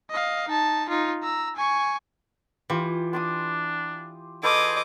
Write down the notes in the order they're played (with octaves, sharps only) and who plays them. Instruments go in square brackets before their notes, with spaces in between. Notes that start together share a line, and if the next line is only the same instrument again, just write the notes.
[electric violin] D#5 F5
D#4 A5
D#4 F4
A#5 E6
G#5 C#6
[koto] E3 [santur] F4 G4
[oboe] D4 [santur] C6 D6 D#6
[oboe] G#4 [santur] A4 B4 C5 [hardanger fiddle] D#5 D6